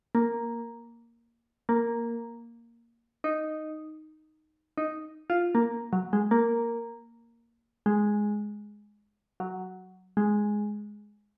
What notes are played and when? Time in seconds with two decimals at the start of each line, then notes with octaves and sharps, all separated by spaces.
0.15 A#3
1.69 A#3
3.24 D#4
4.78 D#4
5.30 F4
5.55 A#3
5.93 F#3
6.13 G#3
6.31 A#3
7.86 G#3
9.40 F#3
10.17 G#3